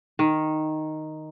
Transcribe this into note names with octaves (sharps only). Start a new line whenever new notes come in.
D#3